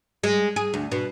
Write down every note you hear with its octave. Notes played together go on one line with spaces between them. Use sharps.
G#3
G#4
D2
B2